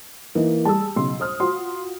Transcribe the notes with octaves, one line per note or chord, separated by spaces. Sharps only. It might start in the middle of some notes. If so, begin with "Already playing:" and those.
E3 A#3 D#4
G3 G#4 A5 E6
B1 C#3 C6
C5 D#6 F6
F4 F#4 C6